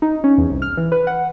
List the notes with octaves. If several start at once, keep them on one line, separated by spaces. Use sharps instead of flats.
D#4
C#4
E2
C2
F6
E3
B4
F#5